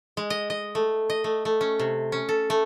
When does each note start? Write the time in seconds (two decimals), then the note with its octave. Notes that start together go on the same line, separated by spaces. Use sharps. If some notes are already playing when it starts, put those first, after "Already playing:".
0.17 G#3
0.30 D#5
0.50 D#5
0.75 A3
1.10 D#5
1.24 A3
1.45 A3
1.61 C#4
1.79 C3
2.12 C#4
2.29 A4
2.50 A3